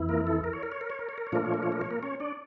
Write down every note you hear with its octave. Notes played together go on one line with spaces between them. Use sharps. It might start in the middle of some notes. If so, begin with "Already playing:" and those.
Already playing: F2 E3 E4
A#3 A#4
A4
A#4
C#5
A#4
C#5
A#4
C#5
A#4
C#5
A#4
C#5
A#2 F3 A3 D4 F4 A#4
C#5
A#4
C#5
A#4
C#5
A#3 A#4
C#4 C#5
D4 D5